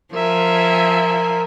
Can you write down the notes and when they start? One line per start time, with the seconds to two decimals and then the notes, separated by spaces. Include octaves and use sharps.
0.14 F3 A#4 E5 G#5